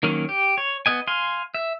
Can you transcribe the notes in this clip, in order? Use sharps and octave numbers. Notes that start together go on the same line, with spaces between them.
D#3 F#3 A#3 C#4
G4
C#5
B3 D#5 G#5
F5 G#5 C6
E5